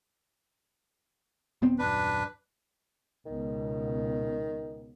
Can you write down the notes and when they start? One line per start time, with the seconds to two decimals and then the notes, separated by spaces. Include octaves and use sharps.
1.62 D#1 B3 C4
1.79 D#1 F#2 D4 B4
3.26 C#2 B2 D#3